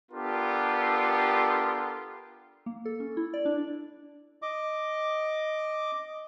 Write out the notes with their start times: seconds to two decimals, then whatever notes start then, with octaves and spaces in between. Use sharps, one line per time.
0.11 B3 D4 F4 G4 A4 A#4
2.66 A#3
2.85 A4
3.00 C#4
3.17 E4
3.34 D5
3.45 D4
4.42 D#5 D6